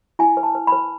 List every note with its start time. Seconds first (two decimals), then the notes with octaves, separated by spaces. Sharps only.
0.19 E4 G#5
0.37 B4
0.43 A5
0.55 B4
0.67 B4 B5